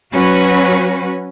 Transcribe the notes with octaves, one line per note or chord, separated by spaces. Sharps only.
F#3 C#4 F#4 B4